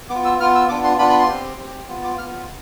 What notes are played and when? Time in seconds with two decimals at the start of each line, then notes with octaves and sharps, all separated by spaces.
0.10 B3 D6
0.15 F4
0.25 E6
0.40 B3 F4 F6
0.55 E6
0.69 B3 D4 F4 D6
0.84 C6
0.99 B3 D4 F4 B5
1.10 B5
1.19 C6
1.29 C4 G4
1.58 C4
1.63 G4
1.88 B3 F4
2.04 D6
2.18 B3 F4 F6